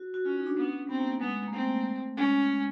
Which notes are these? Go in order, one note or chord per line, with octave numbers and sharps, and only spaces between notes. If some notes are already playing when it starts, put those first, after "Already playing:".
Already playing: F#4
F#4
C#4 F4
D#4
D4
B3 C#4
B3 C4
A#3
A3
G#3 B3
A#3
A3 C4
G#3 C#4
G#3